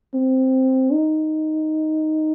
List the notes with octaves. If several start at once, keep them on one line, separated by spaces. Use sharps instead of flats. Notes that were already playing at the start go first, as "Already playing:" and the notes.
C4
D#4